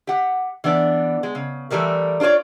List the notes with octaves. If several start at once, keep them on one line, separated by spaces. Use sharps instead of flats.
G4 F#5
E3 B3 D4 D5
G#3
C#3
E3 F3 G3 A3 A#4
D4 F4 A4 C#5 D5